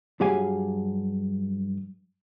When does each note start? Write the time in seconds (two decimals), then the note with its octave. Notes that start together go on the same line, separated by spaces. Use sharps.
0.20 G2 F#3 G4 G#4 F5 G#5